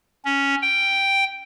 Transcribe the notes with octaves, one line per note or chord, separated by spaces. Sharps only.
C#4
G5